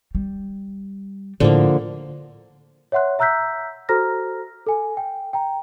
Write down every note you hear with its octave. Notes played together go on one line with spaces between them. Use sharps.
G3
A2 D3 F3 A#3
C#5 E5 F#5 C6 F#6
E5 A#5 E6 F#6 G6 B6
F#4 A4 C5 A#5 F6 A#6
A4 G#5
G5
G5 A#5